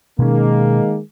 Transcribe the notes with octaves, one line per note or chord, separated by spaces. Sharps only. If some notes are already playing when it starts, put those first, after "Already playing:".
B2 D#3 G#3 A#3 C#4